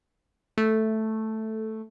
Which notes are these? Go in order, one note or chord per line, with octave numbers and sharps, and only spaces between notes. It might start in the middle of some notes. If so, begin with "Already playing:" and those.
A3